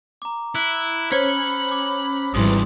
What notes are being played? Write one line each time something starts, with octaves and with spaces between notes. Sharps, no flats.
A#5 D6
E4 E6 F#6
C#4 C5 C#5 B5 F6
D6
G#1 G2 C#3 E3 G3 C6 D#6